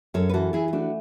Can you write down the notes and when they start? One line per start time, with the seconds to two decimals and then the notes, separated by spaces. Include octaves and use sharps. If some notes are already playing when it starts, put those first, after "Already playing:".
0.14 F#2 A4 C#5
0.29 B4
0.34 E3 F#4 A4
0.53 E3 E4 G#4
0.68 G#4
0.73 A3 D4 F#4